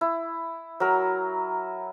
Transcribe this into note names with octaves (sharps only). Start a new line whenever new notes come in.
E4
F#3 A#4